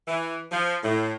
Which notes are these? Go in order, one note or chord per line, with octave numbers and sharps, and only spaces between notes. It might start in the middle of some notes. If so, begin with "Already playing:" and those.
E3
F3
A2